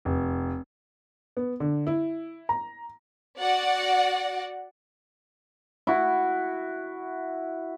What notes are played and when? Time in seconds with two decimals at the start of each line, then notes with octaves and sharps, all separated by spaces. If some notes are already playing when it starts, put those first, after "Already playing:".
0.05 F1
1.37 B3
1.60 D3
1.87 E4
2.49 A#5
3.38 F#4 D5 F#5
5.87 E4 F#4